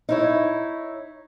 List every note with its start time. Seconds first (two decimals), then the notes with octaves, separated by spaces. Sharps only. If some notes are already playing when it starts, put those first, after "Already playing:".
0.09 D#4 E4 C#5